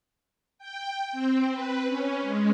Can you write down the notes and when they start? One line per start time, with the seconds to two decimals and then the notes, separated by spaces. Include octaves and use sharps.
0.58 G5
1.12 C4
1.51 B4
1.86 C#4
2.22 G#3